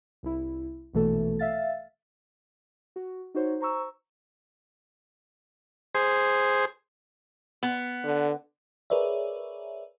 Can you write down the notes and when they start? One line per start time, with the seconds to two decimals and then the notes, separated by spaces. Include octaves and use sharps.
0.23 C2 E4
0.94 A#1 B2 E3 A3 A4
1.39 E5 F5 A6
2.96 F#4
3.35 D#4 F#4 C5 C#5
3.61 C5 A#5 C#6 E6
5.95 G#4 C5
7.63 B3
8.04 D3
8.90 G#4 A#4 B4 C#5 D5 E5